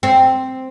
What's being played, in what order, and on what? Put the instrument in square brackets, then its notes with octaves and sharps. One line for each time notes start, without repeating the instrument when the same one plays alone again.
[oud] C4